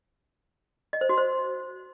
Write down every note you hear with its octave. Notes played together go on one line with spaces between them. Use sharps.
D#5
C5
F#4
C5